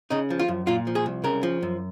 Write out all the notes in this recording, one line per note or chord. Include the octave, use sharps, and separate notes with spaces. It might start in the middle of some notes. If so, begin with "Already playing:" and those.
C#3 D#4
F3
F4
F#2
A#2 F4
F3
G#4
C2
C#3 A#4
F3
F#2